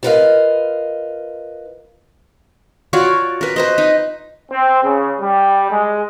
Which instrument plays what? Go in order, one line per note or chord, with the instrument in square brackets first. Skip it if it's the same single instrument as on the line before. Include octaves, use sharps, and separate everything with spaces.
[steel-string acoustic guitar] F4 A#4 B4 D5 D#5 F5
[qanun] F4 F#4 C#5 D5
A#4 B4
B4 C5 D#5
D#4
[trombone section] C4
C#3
G3
G#3